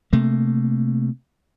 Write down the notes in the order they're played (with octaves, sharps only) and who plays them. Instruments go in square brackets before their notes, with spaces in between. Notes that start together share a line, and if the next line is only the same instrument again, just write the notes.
[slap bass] C3 A3 A#3